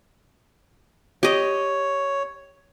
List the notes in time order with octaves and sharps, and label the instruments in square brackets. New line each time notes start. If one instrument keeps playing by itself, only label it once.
[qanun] G4 D#5 [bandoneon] C#5